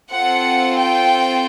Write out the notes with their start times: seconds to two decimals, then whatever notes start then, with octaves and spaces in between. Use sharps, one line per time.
0.12 C4 F4 A4 F#5
0.77 G5